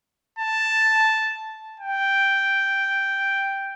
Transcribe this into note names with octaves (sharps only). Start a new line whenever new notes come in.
A5
G5